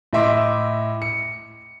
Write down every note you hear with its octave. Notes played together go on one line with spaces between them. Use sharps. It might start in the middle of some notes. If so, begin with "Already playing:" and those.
A2 D#5 E5 C6 D6
C#7